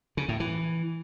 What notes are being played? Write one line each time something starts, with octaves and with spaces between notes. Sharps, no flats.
C#3
A2
E3